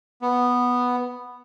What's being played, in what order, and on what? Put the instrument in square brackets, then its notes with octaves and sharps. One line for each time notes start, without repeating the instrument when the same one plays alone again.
[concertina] B3